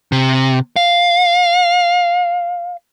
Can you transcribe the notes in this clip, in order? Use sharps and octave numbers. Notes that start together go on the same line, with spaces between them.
C3
F5